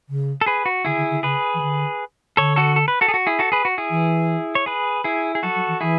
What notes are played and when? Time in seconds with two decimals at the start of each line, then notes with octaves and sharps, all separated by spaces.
0.09 C#3
0.41 A4
0.46 G#4 B4
0.66 F#4
0.85 D3 E4 G#4
0.97 D3
1.11 D3
1.23 C#3 G#4 B4
1.54 E3
1.61 D3
2.37 D3 A4 C#5
2.56 F#4 A4
2.76 A4
2.88 B4
3.01 F#4 A4
3.08 G#4
3.14 F#4
3.27 E4 G#4
3.39 F#4 A4
3.52 G#4 B4
3.65 F#4
3.78 E4 G#4
3.90 E3
4.55 C#5
4.66 G#4 B4
5.04 E4 G#4
5.35 G#4
5.43 F#3 F#4 A4
5.55 F#3
5.68 E3
5.81 E3 E4 G#4